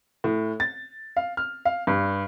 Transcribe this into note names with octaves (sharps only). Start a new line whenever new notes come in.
A2
A6
F5
F6
F5
G2